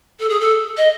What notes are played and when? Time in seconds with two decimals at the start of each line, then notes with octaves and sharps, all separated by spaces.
0.20 A4
0.29 G#4
0.40 A4
0.78 D#5